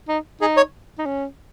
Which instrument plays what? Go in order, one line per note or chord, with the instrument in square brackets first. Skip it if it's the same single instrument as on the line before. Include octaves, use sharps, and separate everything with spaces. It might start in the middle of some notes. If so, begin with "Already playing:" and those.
[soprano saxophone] D#4
[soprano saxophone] D#4 [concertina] G#4
[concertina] C#5
[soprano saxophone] D#4
C#4